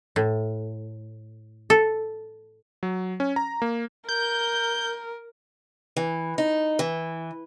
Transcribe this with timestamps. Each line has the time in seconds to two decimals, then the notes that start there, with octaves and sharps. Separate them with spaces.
0.16 A2
1.70 A4
2.83 F#3
3.20 C#4
3.36 A#5
3.62 A#3
4.09 A#4 G6
5.97 E3
6.38 D#4
6.79 E3